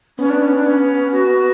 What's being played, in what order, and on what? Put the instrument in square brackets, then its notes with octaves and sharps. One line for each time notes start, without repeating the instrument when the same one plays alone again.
[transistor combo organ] B3 [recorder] C#4
[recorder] D4
C#4
D4
C#4
F#4